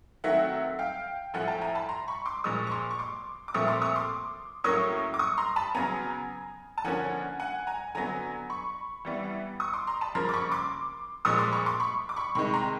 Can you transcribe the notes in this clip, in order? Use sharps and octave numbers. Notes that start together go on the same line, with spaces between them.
D#3 F#3 A3 C4 E5 F#5
F5 G5
A2 F3 A3 F#5 G#5
G5 A5
G#5 A#5
A5 B5
A#5 C6
B5 C#6
C6 D6
A#2 F3 G#3 C#6 D#6
C#6
C6 D6
C#6
C6 D6
D6
A#2 F3 A3 C4 C#6 D#6
C6 D6
C#6 D#6
C6 D6
A2 F#3 A#3 C#4 C#6 D#6
D6
C#6 D#6
A#5 C6
A5 B5
C#3 F#3 B3 G#5 A#5
A5
D3 F3 A#3 C#4 F#5 G#5
F#5 G#5
G#5 A#5
D3 F#3 B3 G#5 A#5
B5 C#6
E3 G3 B3
C#6 D#6
C6 D6
A#5 C6
A5 B5
C#3 F3 A#3 A#5 C6
D6
B5 C#6
C6 D6
A#2 F3 G#3 C#6 D#6
C6 D6
B5 C#6
C6 D6
B5 C#6
D6
B5 C#6
C3 D#3 G#3 B5 C#6
A#5 C6